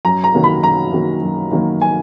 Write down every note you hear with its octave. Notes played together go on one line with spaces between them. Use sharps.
F#2 A#5
A#5
D#3 F#3 A#3
B5
F#2 A#5
D#3 F#3 A#3
F#2
D#3 F#3 A#3
G#5